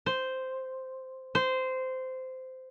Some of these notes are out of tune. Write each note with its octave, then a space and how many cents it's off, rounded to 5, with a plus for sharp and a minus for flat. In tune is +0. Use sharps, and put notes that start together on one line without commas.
C5 -5
C5 -15